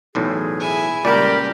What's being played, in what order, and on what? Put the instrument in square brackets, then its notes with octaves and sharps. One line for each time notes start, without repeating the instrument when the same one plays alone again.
[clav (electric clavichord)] B1 E2 A2 [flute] G#4
[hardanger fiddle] E4 G#5
[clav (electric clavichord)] C#2 A#2 D5 [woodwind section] G3 G5 B5 [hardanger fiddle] G4 [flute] A#4